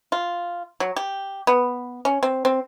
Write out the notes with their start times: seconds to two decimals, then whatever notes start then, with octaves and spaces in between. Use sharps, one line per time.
0.12 F4
0.80 F#3
0.96 G4
1.47 B3
2.05 C#4
2.23 C4
2.45 C4